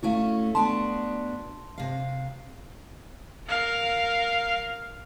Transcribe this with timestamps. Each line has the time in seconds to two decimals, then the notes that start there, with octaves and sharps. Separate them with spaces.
0.03 A3 C#4 E4 F#4 F5
0.55 B3 D4 F#4 A5 C6
1.78 C3 F5
3.48 A#4 F5